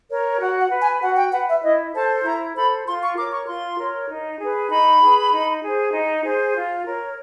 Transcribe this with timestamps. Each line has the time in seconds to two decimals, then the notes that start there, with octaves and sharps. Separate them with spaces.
0.09 A#4 C#5
0.40 F#4 F#5
0.61 F#5
0.71 B4
0.82 G#5
1.02 F#4 F#5
1.17 G5
1.32 B4 F#5
1.48 E5
1.63 E4 D#5
1.94 A4 C5 A5
2.24 E4 A#5
2.55 A4 C5 B5
2.86 F4 C6
3.02 C#6
3.17 A#4 C#5 D6
3.32 C#6
3.47 F4 C6
3.78 A#4 C#5
4.09 D#4
4.39 G#4 B4
4.70 D#4 B5
5.01 G#4 B4
5.32 D#4
5.63 G#4 C5
5.93 D#4
6.24 G#4 C5
6.55 F4
6.85 A#4 C#5